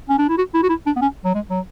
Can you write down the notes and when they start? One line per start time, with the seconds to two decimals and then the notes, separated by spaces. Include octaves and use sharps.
0.09 C#4
0.18 D4
0.29 E4
0.38 F#4
0.54 E4
0.63 F#4
0.69 E4
0.86 D4
0.96 B3
1.02 C#4
1.25 F#3
1.35 G#3
1.50 F#3